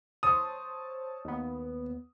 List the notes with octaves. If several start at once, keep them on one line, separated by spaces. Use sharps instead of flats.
C5 C#5 A5 D#6
D#2 B3